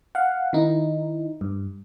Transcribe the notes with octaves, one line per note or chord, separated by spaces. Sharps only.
F5 F#5
D#3 D#4 E4
G2